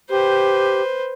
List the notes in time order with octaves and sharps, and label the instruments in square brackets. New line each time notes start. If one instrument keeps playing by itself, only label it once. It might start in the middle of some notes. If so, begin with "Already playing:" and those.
[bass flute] G4 [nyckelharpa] B4 C5